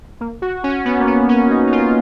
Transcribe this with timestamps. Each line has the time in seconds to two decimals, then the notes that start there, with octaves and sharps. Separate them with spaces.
0.21 A#3
0.42 F#4
0.64 C#4
0.85 B3
0.99 A#3
1.07 B3
1.29 C#4
1.51 D#4
1.67 D#4
1.72 F4